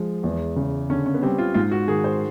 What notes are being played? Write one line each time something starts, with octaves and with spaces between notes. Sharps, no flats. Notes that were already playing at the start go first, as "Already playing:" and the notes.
Already playing: F3 G#3
E2
C#3
D3 C#4
C#4
B3
G3 C4
F4
G#2 F4
F#4
D#3 G#4
C5